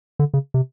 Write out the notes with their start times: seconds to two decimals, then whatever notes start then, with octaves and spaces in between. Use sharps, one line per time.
0.19 D3
0.34 C#3
0.54 C3